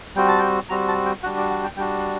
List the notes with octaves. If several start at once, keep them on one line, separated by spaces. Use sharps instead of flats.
G3 C4 F#4 G5
A5
G5
G3 C4 F#4 A#5
A5
G5
G3 D4 F#4 F#5
D5
F#5
G5
G3 D4 F#4 G5